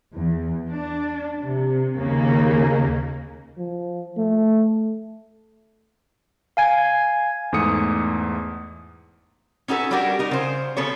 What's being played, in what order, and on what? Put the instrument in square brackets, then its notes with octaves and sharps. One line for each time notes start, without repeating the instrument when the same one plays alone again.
[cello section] E2
D4
C3
D#2 C#3 A#3
[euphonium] F3
A3
[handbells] F5 G#5 G#6
[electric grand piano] E2 G#2 A3 D#6 C#7
[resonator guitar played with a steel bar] C#4 D#4 F#4 A4 B4
G3 C#4 D4 F#4 G4 A#4
D#4 A#4
C#3 C5
C#3 B3 A4 C#5